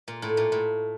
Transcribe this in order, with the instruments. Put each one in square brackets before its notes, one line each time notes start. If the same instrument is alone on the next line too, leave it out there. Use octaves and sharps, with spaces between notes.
[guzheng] A#2
A2
A#2
A2